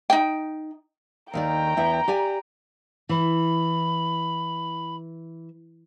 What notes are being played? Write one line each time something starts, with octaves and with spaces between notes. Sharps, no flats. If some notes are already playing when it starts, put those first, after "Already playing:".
D#4 G5
D#2 D#3 D5 G5 A#5
E2 E4 E5
G4 D5 G#5
E3 B5